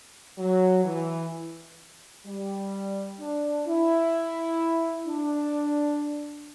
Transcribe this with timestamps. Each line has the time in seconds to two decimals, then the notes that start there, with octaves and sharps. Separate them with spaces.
0.38 F#3
0.85 E3
2.26 G3
3.19 D4
3.67 E4
5.07 D4